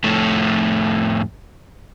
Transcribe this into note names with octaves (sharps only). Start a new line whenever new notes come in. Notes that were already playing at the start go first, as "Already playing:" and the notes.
F2 A2 A3